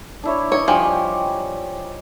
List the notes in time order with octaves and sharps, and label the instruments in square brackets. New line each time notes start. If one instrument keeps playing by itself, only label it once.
[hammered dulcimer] D4 E4 C#5
[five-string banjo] C#5 [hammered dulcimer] D#5
[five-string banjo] F3 [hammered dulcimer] G3 G4 [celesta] G#5